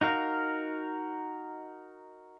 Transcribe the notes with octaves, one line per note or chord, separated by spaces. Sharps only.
D#4 F#4 A#4 F5